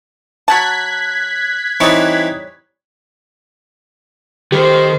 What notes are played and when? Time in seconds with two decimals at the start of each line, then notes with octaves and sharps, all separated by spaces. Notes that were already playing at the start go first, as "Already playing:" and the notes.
0.48 F#3 F#5 A5 F#6 G#6 B6
1.80 E3 G3 C4 D#4 C#5
4.52 D#3 G4 A4 C5